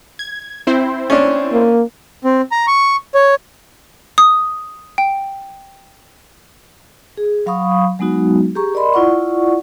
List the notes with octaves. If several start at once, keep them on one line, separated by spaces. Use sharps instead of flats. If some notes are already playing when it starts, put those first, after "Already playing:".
G#6
C4 E4 C5
C#4 D4
A#3
C4
A#5
C#6
C#5
D#6
G5
G#4
F#3 F5 B5 C#6 D#6
F#3 G#3 B3 D#4 F#4
G4 G#4 A#5 C#6
A#4 D5 D#5 B5 C6
E4 F4 D5 F#5 C#6